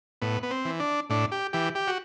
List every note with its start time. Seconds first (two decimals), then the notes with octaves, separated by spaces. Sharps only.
0.22 A2 B3
0.43 B3
0.50 C4
0.65 E3
0.80 D4
1.10 A2 D4
1.32 G4
1.53 E3 G4
1.75 G4
1.88 F#4